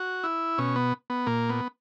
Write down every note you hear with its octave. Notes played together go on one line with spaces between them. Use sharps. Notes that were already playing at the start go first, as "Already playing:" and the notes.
Already playing: F#4
E4
B2 C#4
B3
B3
A#2 A#3
B3